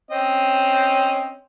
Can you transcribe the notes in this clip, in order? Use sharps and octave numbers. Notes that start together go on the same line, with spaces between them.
C4 C#4 D#5